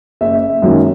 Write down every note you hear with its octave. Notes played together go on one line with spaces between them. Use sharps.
F#1 E5
F#2 D#3 F#3 A#3